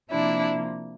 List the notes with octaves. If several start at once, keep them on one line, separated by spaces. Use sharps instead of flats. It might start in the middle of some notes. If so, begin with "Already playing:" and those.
C3 F3 A#3 D4 E4